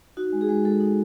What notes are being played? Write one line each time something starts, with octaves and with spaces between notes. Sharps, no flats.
D#4 F#4
G#3
G#4
G#3
G#3 A4
D#4